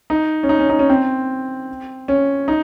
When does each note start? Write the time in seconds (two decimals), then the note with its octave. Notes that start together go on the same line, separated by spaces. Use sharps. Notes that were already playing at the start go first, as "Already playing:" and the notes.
0.10 D#4
0.43 C#4
0.49 D#4
0.59 C#4
0.69 D#4
0.79 C#4
0.89 C4
2.08 C#4
2.48 D#4